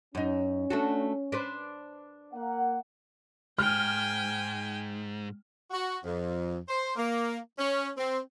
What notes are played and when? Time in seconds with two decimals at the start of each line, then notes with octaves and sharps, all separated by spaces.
0.15 F#2 C#4 D#4
0.70 A3 D4 F#4
1.32 D4 B4 C5
2.33 A#3 F#5
3.59 G#2 G5 G#5 F6
5.71 F#4
6.04 F2
6.69 C5
6.96 A#3
7.59 C#4
7.97 C4